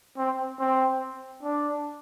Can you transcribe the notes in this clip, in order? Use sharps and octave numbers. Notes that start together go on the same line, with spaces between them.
C4
C4
D4